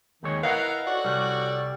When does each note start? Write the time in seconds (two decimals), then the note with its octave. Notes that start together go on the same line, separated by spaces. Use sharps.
0.23 D#2 D#3 G#3 C#5
0.43 E4 A#4 B4 D#5 F5 F#5
0.87 F#4 A4 C#5 D5
1.05 C2 G3